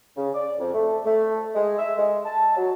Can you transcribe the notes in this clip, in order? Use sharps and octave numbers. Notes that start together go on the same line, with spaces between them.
C#3
D5
F2
A3
A3
G#3
E5
G#3
A5
F#3